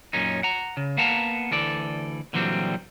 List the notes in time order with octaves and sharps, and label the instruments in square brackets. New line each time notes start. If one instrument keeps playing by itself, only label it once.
[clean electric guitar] F#2 A#2 C#4 D#4
F#5 A#5
C#3
A#3 B3 F5 F#5 A5 A#5
D2 E3 A4 D5
A#2 D3 E3 F#3 G3 C4